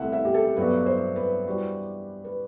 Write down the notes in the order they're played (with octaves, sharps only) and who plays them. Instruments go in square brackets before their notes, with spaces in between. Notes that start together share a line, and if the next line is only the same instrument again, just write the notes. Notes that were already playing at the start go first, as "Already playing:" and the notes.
Already playing: [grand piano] C2 C3 E3 A3 [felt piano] E5 F#5
[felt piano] E5
G4
A4
[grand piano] G2 F#3 B3 D4 F#4 [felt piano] B4
[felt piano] C5
B4
[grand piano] E3 G3 D4 F#4 C5
[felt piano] B4